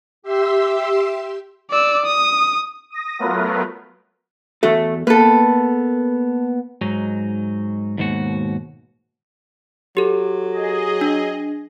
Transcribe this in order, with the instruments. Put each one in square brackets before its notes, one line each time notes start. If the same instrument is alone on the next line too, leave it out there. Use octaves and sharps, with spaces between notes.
[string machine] G4 E5 C6 E6
[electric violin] D5 E6
D#6
[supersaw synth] D#6 A#6
F#3 A3 B3 F4 A#4 B4
[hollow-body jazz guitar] E2 F#4 A4 [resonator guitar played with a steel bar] A3
[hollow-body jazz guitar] A#3 B3 [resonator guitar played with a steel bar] A4 B4
[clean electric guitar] G#2 F#3 D#4
D#2 G#2 B2 F#4
[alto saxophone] F#3 [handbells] G4 A4
[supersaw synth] G#4 D#5
[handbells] D4